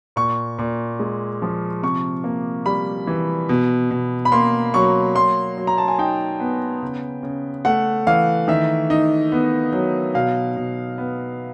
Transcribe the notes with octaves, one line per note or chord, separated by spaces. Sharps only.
A#2 C#6
A#2
G#3
F3
C3 C#6
A#3
G3 B5
E3
B2
B2
B5
A#3 C6
F#3 C#6
F#3 C6
F#3
A#5
A5
G#5
D#4 G5
B3
C#3
C#3
A3 F#5
E3 F5
D#3 E5
D#4
B3
F#3
B2 F5
B2
B3